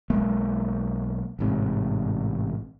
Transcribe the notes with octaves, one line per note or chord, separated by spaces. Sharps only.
B1 G#3 A#3
A1 G#2 C3